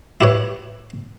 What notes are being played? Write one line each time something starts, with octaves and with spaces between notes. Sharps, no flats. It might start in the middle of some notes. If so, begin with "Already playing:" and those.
E4 G4 B4 C#5